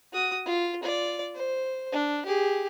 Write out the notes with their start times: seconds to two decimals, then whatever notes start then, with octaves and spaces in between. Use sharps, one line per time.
0.12 F#4 D#6
0.46 F4
0.83 F4 D5
1.35 C5
1.92 D4
2.26 G4 G#4